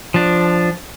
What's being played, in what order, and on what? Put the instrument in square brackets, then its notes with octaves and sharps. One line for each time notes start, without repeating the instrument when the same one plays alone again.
[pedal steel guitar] F3 D4